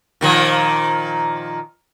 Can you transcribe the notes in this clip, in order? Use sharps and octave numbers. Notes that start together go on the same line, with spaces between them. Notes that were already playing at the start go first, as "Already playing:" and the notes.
A#2 D#3 F3